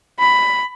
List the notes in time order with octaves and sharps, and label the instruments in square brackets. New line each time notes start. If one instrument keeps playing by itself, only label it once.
[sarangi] B5